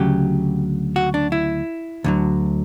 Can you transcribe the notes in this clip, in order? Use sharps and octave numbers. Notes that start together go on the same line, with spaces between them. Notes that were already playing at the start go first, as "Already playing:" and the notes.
Already playing: D2 C#3 F#3 G4
F#4
D4
E4
D2 D3 F#3